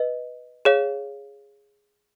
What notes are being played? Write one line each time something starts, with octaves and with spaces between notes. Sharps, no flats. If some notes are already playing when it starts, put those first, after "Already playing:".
Already playing: B4 D#5
G#4 C#5 F5